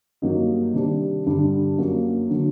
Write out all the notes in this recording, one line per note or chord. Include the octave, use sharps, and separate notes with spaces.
G2 F#3 A#3 D#4
C3 D#3 G3 D4
G2 D3 G3 D4
F#2 F#3 A#3
D3 F#3